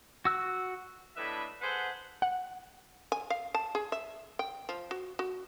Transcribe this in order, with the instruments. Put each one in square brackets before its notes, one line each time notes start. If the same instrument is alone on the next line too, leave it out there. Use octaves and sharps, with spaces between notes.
[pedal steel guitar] F#4 E6 F#6
[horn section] A2 D4 B4 D#5 E5 B5
G#4 A4 B4 C5 F#5
[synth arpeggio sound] F#5
[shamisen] G#5
F5
A5
G#4
E5
G5
F3
F#4
F#4